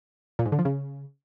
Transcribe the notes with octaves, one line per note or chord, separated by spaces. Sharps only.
A#2
G#2
D3
F3
C#3